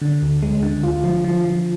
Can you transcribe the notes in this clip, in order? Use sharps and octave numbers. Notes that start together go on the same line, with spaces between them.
D3
D2
G#3
D3
F4
F3
F3
F3